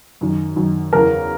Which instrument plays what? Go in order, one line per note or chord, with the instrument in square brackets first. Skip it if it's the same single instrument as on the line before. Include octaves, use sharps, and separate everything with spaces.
[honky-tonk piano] F#2 D#3
F#2 D#3
E2 C#3 E3 A#4